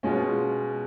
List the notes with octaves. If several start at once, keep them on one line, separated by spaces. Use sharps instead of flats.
B2 G#3 C#4 F4